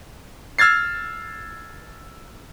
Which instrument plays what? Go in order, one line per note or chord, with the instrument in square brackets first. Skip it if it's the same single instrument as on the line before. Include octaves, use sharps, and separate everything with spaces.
[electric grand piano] E6 F6 G#6 A6 C7